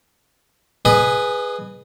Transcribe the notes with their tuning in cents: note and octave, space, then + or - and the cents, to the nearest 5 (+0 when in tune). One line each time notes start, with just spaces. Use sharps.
G#4 +0 B4 +0 D#5 -35